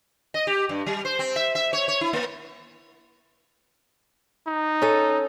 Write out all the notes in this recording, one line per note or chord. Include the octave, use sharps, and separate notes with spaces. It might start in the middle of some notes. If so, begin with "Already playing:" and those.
D#5
G4
G2
G3
C5
C4
E5
E5
C#5
C#5
E4
A#3
D#4
C#4 A4